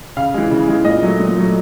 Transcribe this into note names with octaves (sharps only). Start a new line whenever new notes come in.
C#3 F5
E3 G#3
C#3
E3 G#3
A#2 D#5
F#3 A3
A#2
F#3 A3